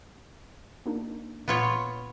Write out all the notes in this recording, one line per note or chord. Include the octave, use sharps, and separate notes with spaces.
A#3 D4 D#4
A#2 B3 F4 C#5